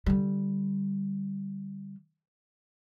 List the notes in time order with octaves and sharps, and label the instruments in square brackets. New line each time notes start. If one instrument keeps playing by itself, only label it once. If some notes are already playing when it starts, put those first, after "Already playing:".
[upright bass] D3 G3